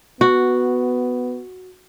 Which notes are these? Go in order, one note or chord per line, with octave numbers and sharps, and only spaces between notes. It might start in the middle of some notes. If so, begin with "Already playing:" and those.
B3 F#4